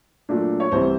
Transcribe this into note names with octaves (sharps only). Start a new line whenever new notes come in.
A#2 F#3 A3 D4
C#5
C2 C3 E3 C5